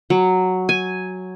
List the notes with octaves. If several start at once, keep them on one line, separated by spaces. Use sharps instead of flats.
F#3
G#5